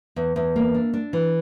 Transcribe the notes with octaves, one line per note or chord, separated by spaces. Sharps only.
E2
E2
A#3
D4
D4
E3